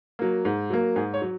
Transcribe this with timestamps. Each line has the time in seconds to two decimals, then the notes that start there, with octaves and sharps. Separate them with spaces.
0.19 F#3 A#3
0.45 G#2
0.70 F#3 A#3
0.96 G#2 G#4
1.14 C#5
1.22 F#3